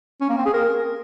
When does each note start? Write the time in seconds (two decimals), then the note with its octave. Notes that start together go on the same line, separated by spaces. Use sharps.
0.21 C#4
0.29 A#3
0.37 C4
0.46 G#4
0.54 A#4